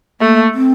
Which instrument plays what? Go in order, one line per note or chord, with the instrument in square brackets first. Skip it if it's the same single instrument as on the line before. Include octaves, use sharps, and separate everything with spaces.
[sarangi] A3 [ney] A#3
[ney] C4